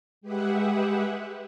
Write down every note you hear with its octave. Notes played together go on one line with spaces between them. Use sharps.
G#3 G4 G#4 B4 E5 F#5